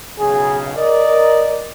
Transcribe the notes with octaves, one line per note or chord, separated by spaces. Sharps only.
B1 C#3 G#4
A#4 D5 D#5